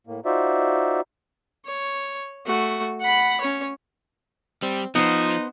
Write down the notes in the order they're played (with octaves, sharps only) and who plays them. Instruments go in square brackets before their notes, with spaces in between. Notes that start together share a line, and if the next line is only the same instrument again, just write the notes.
[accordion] A2 A#3
D#4 F4 F#4 C5 D5 E5
[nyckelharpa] C#5
A3 F#4
F#5 B5
C#4 C#5
[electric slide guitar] G3 [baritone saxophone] C4
[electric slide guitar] F3 [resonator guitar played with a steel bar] B3 C5 [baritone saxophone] D#4